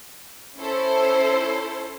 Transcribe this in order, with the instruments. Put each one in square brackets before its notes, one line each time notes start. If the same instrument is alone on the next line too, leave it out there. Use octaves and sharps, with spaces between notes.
[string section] C#4 E4 A4 C5